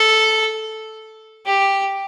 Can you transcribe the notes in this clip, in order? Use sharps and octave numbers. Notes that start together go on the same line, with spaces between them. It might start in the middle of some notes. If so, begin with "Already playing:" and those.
Already playing: A4
G4